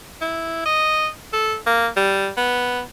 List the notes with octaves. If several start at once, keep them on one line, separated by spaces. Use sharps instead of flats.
E4
D#5
A4
A#3
G3
B3